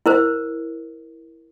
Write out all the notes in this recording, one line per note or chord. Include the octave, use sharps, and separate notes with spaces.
E4 A#4 C5